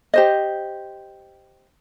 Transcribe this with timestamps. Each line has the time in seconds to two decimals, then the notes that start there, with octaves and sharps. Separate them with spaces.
0.14 G4 C5 D#5